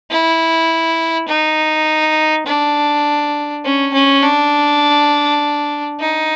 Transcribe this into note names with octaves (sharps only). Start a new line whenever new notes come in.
E4
D#4
D4
C#4
C#4
D4
D#4